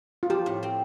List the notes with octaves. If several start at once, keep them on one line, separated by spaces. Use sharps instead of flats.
F4
F3 G4
A2
C4